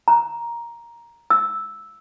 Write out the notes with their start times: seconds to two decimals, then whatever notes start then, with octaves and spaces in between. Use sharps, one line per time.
0.08 A#5
1.30 E6